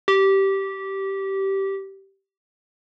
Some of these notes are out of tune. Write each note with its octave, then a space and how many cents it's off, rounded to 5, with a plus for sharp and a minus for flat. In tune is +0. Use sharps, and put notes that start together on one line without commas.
G4 -15